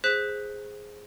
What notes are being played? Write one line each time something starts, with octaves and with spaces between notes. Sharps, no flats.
G#4 C5 F#6 B6 E7